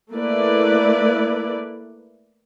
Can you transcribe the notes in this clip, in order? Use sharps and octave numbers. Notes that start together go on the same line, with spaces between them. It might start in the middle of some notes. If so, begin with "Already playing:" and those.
A3 A#3 E4 B4 D5